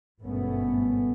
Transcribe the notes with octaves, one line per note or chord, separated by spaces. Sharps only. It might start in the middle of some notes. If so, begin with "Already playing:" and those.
G#1 G2 B2 A3 B3 C#4